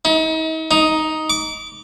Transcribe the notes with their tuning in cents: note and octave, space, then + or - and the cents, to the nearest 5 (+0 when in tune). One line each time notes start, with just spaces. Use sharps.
D#4 +40
D#4 +5
D6 -25